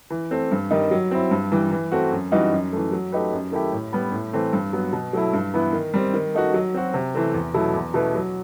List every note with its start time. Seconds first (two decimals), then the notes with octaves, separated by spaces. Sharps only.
0.10 E3
0.31 A3 C4
0.51 G2
0.71 D#3 G3 D#4
0.91 F#3
1.11 C4 E4
1.31 G2
1.52 E3 G3
1.71 E3
1.91 A3 C4 F#4
2.12 F#2
2.31 E3 G3 D#4 F#4
2.52 F#2
2.72 E3 A3
2.92 F#3
3.12 A3 D#4 G4 B4
3.33 F#2
3.52 D#3 A3 E4 G4
3.72 A2
3.93 G3 B3
4.12 A2
4.33 E3 A3 C4
4.53 G2
4.73 F#3 B3
4.93 B2
5.13 F#3 A3 E4
5.33 G2
5.54 E3 B3 E4
5.73 D#3
5.94 G3 C4
6.14 D#3
6.34 A3 D#4 F#4
6.54 F#3
6.74 C4 F#4
6.94 C3
7.15 E3 A3 C4
7.34 E2
7.54 B2 F#3 A3 E4
7.74 E2
7.94 B2 A3 E4 B4
8.14 F#3